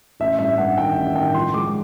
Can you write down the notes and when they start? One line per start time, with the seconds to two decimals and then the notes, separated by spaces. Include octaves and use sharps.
0.20 A1 E5
0.39 G2 E5
0.58 G2 F#5
0.77 D#3 G5
0.97 A1
1.15 D#3 G5
1.34 F3 C6
1.54 G#3 D6